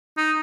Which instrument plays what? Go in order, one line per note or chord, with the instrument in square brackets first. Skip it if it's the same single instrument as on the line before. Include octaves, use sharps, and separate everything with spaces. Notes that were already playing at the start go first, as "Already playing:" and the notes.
[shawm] D#4